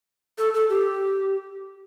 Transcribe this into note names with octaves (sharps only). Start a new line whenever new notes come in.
A4
A4
G4